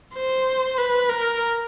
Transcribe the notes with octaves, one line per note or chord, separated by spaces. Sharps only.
C5
B4
A#4